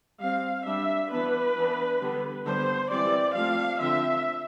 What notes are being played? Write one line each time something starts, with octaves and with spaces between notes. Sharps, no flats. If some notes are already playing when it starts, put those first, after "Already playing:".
G3 C4 F5
G3 D4 E5
E3 B3 D4 B4
E3 B3 D4
D3 G3 B3
D3 G3 B3 C5
E3 G3 C4 D5
F3 A3 C4 F5
D3 F3 C4 E5